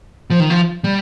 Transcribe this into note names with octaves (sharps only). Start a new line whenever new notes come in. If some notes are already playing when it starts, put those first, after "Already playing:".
F3
D#3
F3
G3